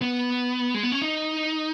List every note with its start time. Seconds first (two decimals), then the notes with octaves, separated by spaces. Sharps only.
0.02 B3
0.74 G#3
0.83 B3
0.92 C#4
1.02 D#4